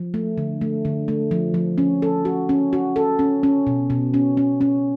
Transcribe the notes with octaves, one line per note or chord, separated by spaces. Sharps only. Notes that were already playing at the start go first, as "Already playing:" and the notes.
Already playing: F3
A3
D3
A3
D3
A3
F3
F3
C#4
A4
F#4
C#4
F#4
A4
C#4
C#4
B2
B2
C#4
C#4
C#4